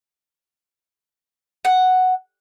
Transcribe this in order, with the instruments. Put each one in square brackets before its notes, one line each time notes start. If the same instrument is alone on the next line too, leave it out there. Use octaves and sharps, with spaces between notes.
[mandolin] F#5